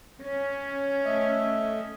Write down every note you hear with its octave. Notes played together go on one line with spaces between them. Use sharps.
C#4
A3 D#5 E5